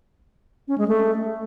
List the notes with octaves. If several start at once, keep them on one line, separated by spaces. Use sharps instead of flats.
C#4
G#3
A3